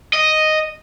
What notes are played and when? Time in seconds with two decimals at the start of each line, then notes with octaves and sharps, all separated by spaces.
0.13 D#5